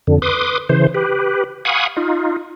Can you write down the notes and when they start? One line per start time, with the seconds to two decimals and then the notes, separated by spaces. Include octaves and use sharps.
0.07 F2 D3
0.22 B4 C6 D6 D#6
0.69 C#3 E3 C5
0.94 G4 B4
1.65 F5 F#5 G#5 B5 C#6 D#6
1.97 D#4 F4